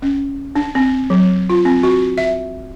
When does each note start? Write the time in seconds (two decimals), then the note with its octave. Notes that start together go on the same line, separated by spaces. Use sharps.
0.02 C#4
0.55 D4
0.75 C4
1.10 F#3
1.50 F4
1.65 C4
1.83 F#4
2.18 E5